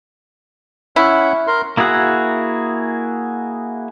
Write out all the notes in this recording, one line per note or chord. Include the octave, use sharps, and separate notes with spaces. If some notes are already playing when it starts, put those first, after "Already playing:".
C#4 E4 F#5
A#4 C6
A#3 E4 F#4 G#4 F#5